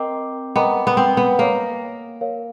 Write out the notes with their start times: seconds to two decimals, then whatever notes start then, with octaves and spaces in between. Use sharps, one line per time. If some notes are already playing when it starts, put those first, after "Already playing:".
Already playing: C4 A#4 D#5 G5 A#5 D6
0.56 B3 A#4 D#5 G5 A#5 D6
0.87 B3
0.97 C4
1.17 B3
1.38 A#3 A#4 C#5 F5
2.21 A#4 C#5 F5